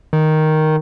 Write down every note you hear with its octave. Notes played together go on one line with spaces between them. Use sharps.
D#3